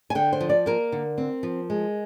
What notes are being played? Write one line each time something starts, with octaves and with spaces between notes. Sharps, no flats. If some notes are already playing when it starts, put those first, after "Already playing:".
G#5
D3 G5
C5
F3
D5
A#3 A#4
D3
C4
F3
G#3